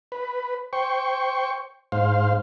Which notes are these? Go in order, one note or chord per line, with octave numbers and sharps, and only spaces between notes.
B4
C5 G5 C#6
G#2 C5 F5